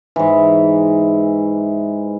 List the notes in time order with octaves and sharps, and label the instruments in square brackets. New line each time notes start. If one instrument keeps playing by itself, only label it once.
[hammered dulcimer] G#2 E3